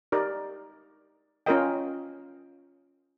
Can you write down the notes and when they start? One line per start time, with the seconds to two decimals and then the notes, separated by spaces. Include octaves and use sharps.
0.12 D#4 G4 A#4 D5
1.46 C#4 F4 A#4 D#5 G5